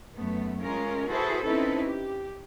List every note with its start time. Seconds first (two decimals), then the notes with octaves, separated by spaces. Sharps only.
0.16 F#2 A3 B3
0.62 G#3 A3 C#4 F4 A#4
1.09 E4 F#4 G#4 A4 B4 C5
1.43 C4 C#4 D#4 E4 A4 B4
1.84 G4